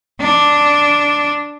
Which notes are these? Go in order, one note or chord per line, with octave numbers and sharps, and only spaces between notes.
D4